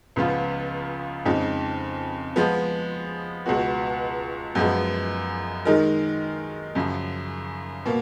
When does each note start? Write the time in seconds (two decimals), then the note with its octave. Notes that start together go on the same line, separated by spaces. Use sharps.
0.16 C#2 C#3 F3 B3 F4
1.25 F2 C#3 G#3 D#4
2.36 F3 G#3 B3
3.46 C#2 B2 G#3 B3 F#4
4.55 F#2 F3 G#3 B3
5.65 D#3 G#3 D#4 A#4
6.75 F#2 C#3 F3
7.86 B2 A#3